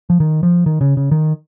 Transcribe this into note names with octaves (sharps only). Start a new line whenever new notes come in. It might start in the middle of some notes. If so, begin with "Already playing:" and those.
F3
D#3
F3
D#3
C#3
C#3
D#3